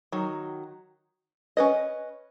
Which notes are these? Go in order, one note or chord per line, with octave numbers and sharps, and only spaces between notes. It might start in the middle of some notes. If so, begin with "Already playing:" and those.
D#3 F#3
C#4 B4 D#5